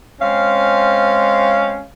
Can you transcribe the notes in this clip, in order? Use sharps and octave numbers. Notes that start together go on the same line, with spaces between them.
G#3 C4 C#4 F5